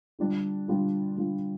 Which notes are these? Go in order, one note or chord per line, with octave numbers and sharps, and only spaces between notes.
D3 G3 D4 F4
D3 G3 D4 F4
D3 G3 D4 F4